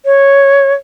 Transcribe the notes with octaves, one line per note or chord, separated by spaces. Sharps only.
C#5